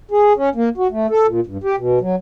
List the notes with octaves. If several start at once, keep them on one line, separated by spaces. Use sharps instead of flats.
G#4
C#4
A#3
F#4
A3
A4
A#2
G2
G4
B2
F#3